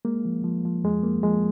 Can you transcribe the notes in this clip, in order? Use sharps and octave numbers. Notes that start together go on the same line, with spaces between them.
G#3 A#3
F3
F3
F3
F2 G#3
F3 A#3
F3 G#3